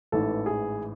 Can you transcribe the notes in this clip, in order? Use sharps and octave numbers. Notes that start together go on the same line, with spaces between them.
A1 G#2 E3 A4
G#4